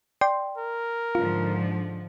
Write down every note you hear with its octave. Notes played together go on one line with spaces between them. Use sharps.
D5 G5 C6
A#4
G#2 D3 F3 F4